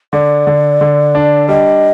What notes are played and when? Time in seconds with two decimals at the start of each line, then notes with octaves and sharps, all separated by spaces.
0.13 D3 D5
0.47 D3
0.81 D3
1.15 D4
1.49 G3 D#5